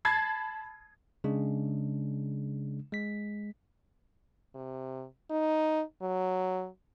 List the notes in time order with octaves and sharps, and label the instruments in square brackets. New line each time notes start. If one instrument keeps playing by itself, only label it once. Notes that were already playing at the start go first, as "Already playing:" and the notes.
[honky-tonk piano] A5 B5 G#6 A6 C7
[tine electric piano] C#3 G#3 D4
G#3 B6
[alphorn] C3
D#4
F#3